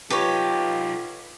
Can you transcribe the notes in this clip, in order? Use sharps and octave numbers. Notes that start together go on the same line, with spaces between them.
D#4 F4 G4 A4 B4 C#5